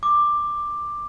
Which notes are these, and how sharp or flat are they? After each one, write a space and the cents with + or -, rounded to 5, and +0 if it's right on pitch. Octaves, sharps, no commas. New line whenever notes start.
D6 +10